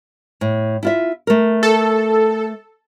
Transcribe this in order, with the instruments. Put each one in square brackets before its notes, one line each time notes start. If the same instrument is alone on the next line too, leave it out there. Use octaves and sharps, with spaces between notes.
[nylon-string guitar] A2
E4 F4 E5
A3 A#4
[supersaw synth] A4